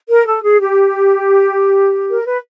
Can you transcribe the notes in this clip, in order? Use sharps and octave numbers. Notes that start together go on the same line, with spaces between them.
A#4
A4
G#4
G4
A#4
B4